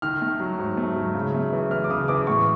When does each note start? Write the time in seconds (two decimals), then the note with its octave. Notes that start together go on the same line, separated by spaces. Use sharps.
0.02 D#3 F6
0.22 A3
0.40 F#3
0.59 G#2
0.77 A3
0.96 F#3
1.15 C#3
1.34 A3
1.53 E3
1.71 E3 F6
1.84 D6
1.90 C#3 D#6
2.08 E3 D6
2.27 A2 C#6